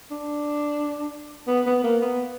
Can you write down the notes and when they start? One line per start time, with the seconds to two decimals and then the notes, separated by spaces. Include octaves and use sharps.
0.11 D4
1.48 B3
1.66 B3
1.84 A#3
2.02 B3